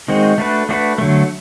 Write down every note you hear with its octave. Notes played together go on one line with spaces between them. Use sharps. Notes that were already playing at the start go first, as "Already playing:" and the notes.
D#3 G#3 C4 D#4 F#4
A3 D4 F#4 B4
A3 D4 F#4 B4
D3 F#3 A3